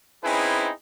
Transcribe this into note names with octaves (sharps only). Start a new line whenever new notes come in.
C4 C#4 D#4 E4 G#4 B4